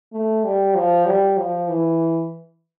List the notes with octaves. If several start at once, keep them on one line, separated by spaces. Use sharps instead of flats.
A3
G3
F3
G3
F3
E3